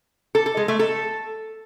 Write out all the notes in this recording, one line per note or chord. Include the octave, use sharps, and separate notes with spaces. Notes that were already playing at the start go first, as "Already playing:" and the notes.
A4
A4
G#3
A3
A4